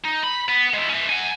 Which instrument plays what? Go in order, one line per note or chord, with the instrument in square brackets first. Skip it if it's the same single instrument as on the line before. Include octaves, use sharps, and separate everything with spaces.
[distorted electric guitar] D#4
B5
B3
G#3 E4
C#4 E5
F#5 G#5